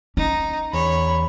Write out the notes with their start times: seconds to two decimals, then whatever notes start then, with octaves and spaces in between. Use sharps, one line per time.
0.17 C#4 D#4
0.73 E2 C#5 B5